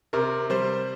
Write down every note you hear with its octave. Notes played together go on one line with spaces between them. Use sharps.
C3 A#4
G3 C5